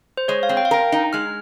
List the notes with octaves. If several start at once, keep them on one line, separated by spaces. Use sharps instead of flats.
C5
G#3 C#5
F5
C4
G5
F5
A#4 G5
D#4
G#3 F6